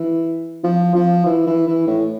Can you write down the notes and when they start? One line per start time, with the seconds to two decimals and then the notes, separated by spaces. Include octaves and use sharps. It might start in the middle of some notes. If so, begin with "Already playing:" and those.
Already playing: E3
0.64 F3
0.95 F3
1.26 E3
1.47 E3
1.67 E3
1.88 A2